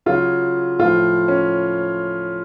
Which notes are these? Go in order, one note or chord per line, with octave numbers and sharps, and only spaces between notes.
C#3 F#3 F4
A2 F3 F4
C#4